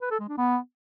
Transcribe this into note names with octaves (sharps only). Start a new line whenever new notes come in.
B4
A4
G#3
D4
B3